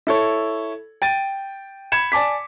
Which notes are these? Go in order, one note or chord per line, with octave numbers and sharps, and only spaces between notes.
E4 A4 C#5
G5 A6 D#7
B5 G#6 C#7 E7
D5 G#5 A5 D6 B6